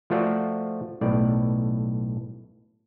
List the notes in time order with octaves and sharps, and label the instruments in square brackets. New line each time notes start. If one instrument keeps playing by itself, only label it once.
[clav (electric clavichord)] F3 A3 F4 F#4 C5 D5
B1 A2 D5